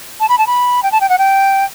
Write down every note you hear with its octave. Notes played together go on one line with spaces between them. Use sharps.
A5
B5
A5
B5
G5
A5
G5
F#5
G5